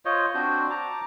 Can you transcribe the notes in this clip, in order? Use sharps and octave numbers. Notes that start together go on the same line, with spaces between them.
F4 C5 C#5 D#5
C4 D4 F#4 C5
A5 A#5 D6